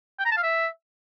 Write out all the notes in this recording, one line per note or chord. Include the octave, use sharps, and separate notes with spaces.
G5
A#5
A5
F5
E5